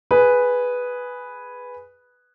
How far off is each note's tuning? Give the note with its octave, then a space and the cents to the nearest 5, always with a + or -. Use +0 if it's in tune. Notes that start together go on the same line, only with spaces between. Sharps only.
G#4 +0 B4 +0